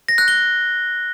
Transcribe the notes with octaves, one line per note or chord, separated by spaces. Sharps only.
A#6
F#6
G7